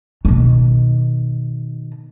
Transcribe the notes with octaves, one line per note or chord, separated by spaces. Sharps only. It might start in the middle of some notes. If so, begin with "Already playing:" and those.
B2 D#3